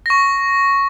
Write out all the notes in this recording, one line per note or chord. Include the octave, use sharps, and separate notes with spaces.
C#6 A#6